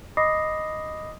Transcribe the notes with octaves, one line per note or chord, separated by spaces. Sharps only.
D#5 B5 D6 D#6 A#6 C7